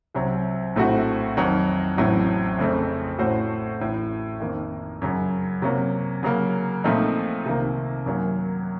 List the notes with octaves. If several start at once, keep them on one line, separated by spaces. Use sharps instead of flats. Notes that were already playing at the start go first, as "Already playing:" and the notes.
C2 C3 F#3 C4
A#1 A2 A3 C4 F#4
F2 D#3 F#3
A1 A2 F#3 C4
F2 C#3 A3 C4
A2 A3 C#4 F#4 C5
A1 A2 A3
F2 D#3 A#3
F#2 C#3 F#3
C3 F#3 A#3 C#4
C#3 F#3 A#3
A#2 F3 A3 C4 D#4
C2 C3 D#3 A#3
F#2 D#3 F#3 A#3